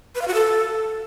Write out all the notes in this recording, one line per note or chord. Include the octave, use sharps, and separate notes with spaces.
B4
F5
F#4
A4